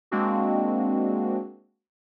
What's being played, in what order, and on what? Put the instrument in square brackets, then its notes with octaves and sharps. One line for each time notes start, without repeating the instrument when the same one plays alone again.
[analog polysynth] G#3 A#3 C4 D4 F#4